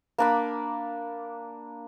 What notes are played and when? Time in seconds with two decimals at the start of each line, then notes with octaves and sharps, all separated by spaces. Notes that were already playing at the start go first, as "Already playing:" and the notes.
0.18 A#3 D4 B5